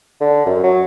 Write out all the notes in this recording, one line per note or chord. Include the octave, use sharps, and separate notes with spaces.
D3
F#2
F#3